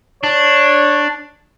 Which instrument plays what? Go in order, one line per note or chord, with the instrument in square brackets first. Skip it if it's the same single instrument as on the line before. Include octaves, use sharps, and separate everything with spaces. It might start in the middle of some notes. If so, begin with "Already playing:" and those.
[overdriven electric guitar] D4 [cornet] C#5